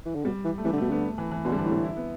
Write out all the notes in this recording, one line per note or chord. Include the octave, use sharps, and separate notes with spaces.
E3
D3
B2 G3
E3
A3
E3 G3
D3
B2 A3
D3 B3
A3
E3
E3
B2 D3
G3
E3
A2
G3
E4
B3